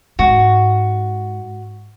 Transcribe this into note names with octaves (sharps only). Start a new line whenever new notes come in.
G#2 F#4